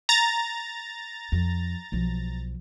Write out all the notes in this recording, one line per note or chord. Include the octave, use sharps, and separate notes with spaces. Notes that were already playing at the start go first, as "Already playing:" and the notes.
A#5 A6
F2
B1 F3